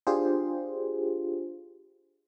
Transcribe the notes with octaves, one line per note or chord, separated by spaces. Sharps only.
D4 F4 G4 G#4 C5